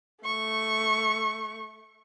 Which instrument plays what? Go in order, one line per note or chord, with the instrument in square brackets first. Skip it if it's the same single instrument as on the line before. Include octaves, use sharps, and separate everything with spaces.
[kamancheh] A3 C#6